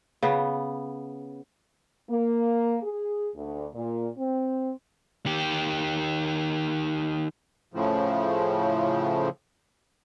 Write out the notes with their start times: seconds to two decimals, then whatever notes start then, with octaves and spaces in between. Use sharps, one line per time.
0.22 C#3 B3
2.10 A#3
2.83 G#4
3.36 D2
3.75 A#2
4.17 C4
5.26 D#3 G4
7.74 A2 C#3 F3